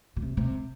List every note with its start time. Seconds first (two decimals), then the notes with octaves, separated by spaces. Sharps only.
0.16 B2
0.22 C3
0.37 C3